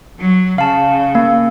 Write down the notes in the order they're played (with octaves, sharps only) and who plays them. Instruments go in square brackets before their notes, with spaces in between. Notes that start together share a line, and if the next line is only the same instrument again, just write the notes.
[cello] F#3
[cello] C#3 [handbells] F5 A5
[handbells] A#3